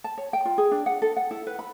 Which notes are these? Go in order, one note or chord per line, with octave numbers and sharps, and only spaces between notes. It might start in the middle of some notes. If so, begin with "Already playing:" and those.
A5
C#5
G5
F4
G#4
D4
F#5
A4
F#5
E4
B4
B5